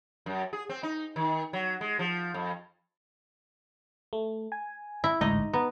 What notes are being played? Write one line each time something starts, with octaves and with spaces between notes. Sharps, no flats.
F#2
G#4
C4
D#4
D#3
F#3
G#3
F3
F2
A3
G#5
E4
A1 D2 G#2 D#4 D#5
B3 A#5